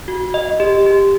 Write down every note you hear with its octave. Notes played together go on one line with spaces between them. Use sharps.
F#4
D#5
G4
G4